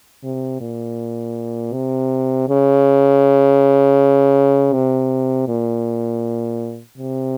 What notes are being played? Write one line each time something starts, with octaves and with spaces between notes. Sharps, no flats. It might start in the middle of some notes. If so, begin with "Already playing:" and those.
C3
A#2
C3
C#3
C3
A#2
C3